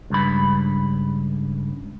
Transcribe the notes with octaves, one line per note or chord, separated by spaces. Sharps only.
C#2 G2 B5